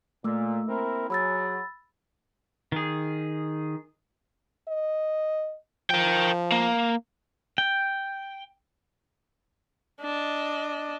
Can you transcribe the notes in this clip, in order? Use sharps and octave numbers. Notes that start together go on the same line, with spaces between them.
A#2 A3 E6
A#3 C4 E4 A#4
F#3 G#4 B5 E6 A6
D#3 G#4
D#5
F3 A#4 G5
A#3
G5
D4 D#5